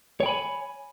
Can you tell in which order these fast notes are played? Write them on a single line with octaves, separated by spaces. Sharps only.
C#5 G5 B5 G#5